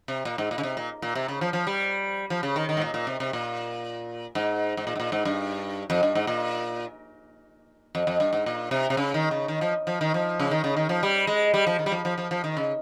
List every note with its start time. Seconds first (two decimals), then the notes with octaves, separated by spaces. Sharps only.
0.08 C3
0.25 A#2
0.38 G#2
0.51 A#2
0.58 C#3
0.63 C3
0.77 A#2
1.02 A#2
1.15 C3
1.28 C#3
1.41 F3
1.53 F3
1.67 G3
2.30 F3
2.43 C#3
2.56 D#3
2.69 D#3
2.77 G#2
2.82 A#2
2.94 A#2
3.07 C3
3.20 C3
3.33 A#2
4.35 G#2
4.77 G#2
4.87 A#2
4.95 G#2
5.00 A#2
5.12 G#2
5.25 G2
5.90 F2
6.03 G2
6.15 G#2
6.27 A#2
7.95 F2
8.07 F2
8.20 G2
8.33 G#2
8.46 A#2
8.71 C3
8.90 C3
8.97 C#3
9.14 D#3
9.31 C#3
9.48 D#3
9.61 F3
9.87 F3
10.01 D#3
10.14 F3
10.40 C#3
10.51 D#3
10.64 C#3
10.77 D#3
10.89 F3
11.03 G3
11.27 G#3
11.54 G3
11.67 F3
11.79 D#3
11.86 G3
11.92 F3
12.05 F3
12.18 F3
12.31 F3
12.44 D#3
12.57 C#3